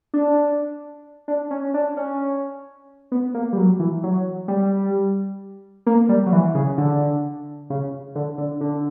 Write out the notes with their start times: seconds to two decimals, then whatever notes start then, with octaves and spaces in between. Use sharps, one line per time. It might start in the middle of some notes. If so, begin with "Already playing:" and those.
0.14 D4
1.28 D4
1.51 C#4
1.74 D4
1.97 C#4
3.12 B3
3.34 A#3
3.53 G3
3.57 F#3
3.79 E3
4.03 F#3
4.48 G3
5.86 A#3
6.09 G3
6.26 F#3
6.33 E3
6.55 C#3
6.78 D3
7.70 C#3
8.15 D3
8.38 D3
8.61 D3